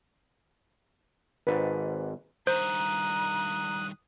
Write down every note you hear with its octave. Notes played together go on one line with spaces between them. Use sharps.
G#1 G#2 B4
G2 D#3 C5 A#5 D#6 F#6